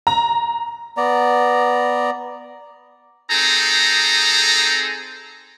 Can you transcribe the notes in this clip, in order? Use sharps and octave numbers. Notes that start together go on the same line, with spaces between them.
A#5
B3 D5 A#5
C4 D#4 G#4 A4 A#5